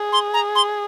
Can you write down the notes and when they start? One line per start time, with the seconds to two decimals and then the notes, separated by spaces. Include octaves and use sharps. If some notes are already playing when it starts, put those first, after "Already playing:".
Already playing: G#4
0.12 C6
0.34 A#5
0.55 C6